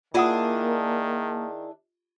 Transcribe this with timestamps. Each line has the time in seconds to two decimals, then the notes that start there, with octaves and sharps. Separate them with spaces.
0.14 D#3 A#3 D4 E4 F4 G#4 F#5 D#6